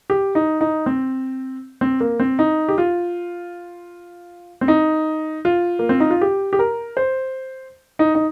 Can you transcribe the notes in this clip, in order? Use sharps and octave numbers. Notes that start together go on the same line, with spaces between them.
G4
D#4
D#4
C4
C4
A#3
C4
D#4
G4
F4
C4
D#4
F4
A#3
C4
D#4
F4
G4
G4
A#4
C5
D#4
D#4